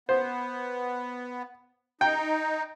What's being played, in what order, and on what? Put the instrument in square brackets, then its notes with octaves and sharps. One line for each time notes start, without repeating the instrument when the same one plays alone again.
[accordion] B3 [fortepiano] C5
[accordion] D#4 [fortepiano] G5